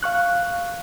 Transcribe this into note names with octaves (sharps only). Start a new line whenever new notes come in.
F5 C#6 F#6